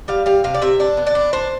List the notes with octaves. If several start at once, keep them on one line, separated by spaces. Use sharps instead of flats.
G3 F5
G3 F5
C3 F5
D5
C3 E5
D4 D5
B3
D5
D4
D4 C5